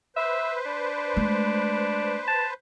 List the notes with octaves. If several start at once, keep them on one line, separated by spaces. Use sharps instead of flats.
B4 C5 E5
D4
G#3 A3
A5